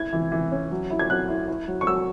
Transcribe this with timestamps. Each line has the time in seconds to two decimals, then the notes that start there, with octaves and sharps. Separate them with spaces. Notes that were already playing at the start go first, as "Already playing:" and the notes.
Already playing: E4 G#6
0.13 E3
0.32 E3
0.52 C#4
0.72 F#3
0.90 E4
0.99 G#6
1.10 F#3 F#6
1.29 E4
1.48 E4
1.68 F#3
1.81 C#6
1.87 F#3 E6